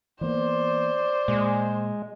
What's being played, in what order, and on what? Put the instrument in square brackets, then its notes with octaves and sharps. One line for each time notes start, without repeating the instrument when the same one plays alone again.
[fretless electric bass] E3 A#3 B3 [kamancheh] C5 [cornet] D5
[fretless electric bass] A#2 [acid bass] G#3